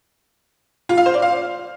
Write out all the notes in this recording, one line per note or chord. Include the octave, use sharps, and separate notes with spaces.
F4
F5
C5
D5
F5